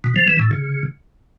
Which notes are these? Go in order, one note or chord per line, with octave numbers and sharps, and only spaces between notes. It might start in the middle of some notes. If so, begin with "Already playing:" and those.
B2
F3
E3
A2
C#3